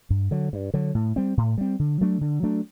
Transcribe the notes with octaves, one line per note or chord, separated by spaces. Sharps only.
G2
D3 F#3
G2
D3 F#3
A2
G3 C4
A2
G3 C4
D3
F#3 A3 D4
D3
F#3 A3 D4